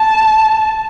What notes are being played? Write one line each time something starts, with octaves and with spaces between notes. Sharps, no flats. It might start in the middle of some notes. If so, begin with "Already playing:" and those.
Already playing: A5